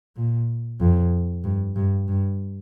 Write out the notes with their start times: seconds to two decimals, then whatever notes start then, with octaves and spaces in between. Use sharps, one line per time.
0.17 A#2
0.80 F2
1.44 G2
1.76 G2
2.08 G2